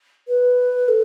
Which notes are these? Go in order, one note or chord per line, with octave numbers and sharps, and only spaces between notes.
B4
A4